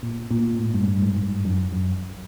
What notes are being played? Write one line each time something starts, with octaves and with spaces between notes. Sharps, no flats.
A#2
A#2
A2
G2
G2
G#2
G2
F#2
F#2